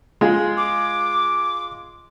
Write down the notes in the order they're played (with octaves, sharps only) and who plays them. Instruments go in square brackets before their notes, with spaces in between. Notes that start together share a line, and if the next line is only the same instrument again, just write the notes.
[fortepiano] G#3 F4 G#4
[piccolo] D6